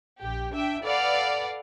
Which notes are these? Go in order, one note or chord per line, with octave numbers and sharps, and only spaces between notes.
A#1 G4
D4 E5 G5
A4 B4 D5 F5 F#5